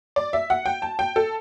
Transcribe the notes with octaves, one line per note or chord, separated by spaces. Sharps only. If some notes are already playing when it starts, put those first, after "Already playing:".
D5
E5
F#5
G5
A5
G5
A4